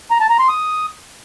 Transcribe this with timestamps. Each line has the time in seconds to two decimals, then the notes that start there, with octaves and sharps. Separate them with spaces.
0.11 A#5
0.20 A5
0.30 A#5
0.39 C6
0.49 D#6